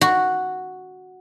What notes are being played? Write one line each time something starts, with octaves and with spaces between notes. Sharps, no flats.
F#4